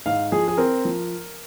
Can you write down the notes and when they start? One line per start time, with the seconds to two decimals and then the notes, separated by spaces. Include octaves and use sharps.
0.06 G#2 F5
0.32 F3 G#4
0.48 G#4
0.57 C4 A#4
0.85 F3